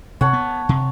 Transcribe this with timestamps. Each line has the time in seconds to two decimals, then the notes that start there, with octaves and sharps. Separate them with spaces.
0.21 C3 C#5 F#5 A5
0.33 B3
0.69 C3